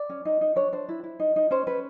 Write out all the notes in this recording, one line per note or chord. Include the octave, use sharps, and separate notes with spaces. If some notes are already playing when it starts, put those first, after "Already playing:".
Already playing: D5
C#4
D#4
D#4
D4 C#5
D4 C5
E4
E4
D#4
D#4
C#4 C5
C#4 B4